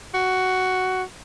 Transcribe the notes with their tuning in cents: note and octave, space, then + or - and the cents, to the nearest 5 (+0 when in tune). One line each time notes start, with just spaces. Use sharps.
F#4 +5